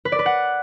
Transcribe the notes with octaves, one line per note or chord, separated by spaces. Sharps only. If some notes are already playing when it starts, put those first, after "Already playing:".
B4
D5
B4
F#5